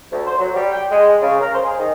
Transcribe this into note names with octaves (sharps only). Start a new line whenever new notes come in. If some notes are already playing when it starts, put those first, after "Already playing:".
D2
C5
F#3
G3
G5
G#3
C#3
A#4
C5
G#4
D#3